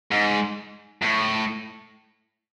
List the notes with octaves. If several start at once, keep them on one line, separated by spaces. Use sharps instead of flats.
G#2
A2